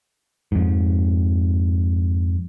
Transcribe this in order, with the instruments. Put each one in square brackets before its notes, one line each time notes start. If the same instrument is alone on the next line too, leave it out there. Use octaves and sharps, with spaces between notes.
[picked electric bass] F2 G#2